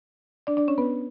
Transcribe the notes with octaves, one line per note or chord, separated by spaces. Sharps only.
D4 D5
D4 D5
C#4 C#5
B3 B4